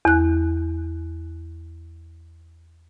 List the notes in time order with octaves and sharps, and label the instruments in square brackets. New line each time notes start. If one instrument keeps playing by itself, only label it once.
[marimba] E2 F#6